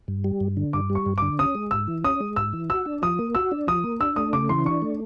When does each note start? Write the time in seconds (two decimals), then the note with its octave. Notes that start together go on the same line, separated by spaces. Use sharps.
0.08 G2
0.24 G3
0.40 G2
0.57 D3
0.73 G2 D6
0.90 G3
0.95 C#6
1.06 G2
1.18 D3 D6
1.39 C#4 D#6
1.55 G#3
1.71 G#2 E6
1.88 E3
2.04 C#4 D#6
2.20 G#3
2.36 G#2 E6
2.53 E3
2.69 F#4 E6
2.86 D4
3.02 F3 D#6
3.19 A#3
3.35 F#4 E6
3.51 D4
3.67 F3 D#6
3.84 A#3
4.00 D4 E6
4.16 A3 D#6
4.33 C#3 D6
4.49 E3 C6
4.65 D4 C#6
4.82 A3